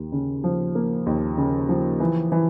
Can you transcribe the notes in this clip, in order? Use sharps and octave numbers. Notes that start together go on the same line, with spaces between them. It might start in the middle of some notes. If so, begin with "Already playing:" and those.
Already playing: D#2
C#3
F3
A#3
D#2
C#3
F3
E3
E3